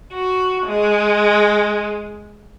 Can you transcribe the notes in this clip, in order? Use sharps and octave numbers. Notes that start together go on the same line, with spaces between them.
F#4
G#3